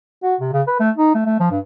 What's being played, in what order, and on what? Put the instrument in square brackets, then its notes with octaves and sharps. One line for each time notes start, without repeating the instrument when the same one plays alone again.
[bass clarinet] F#4
C3
C#3
B4
A3
D#4
A3
A3
F3
G2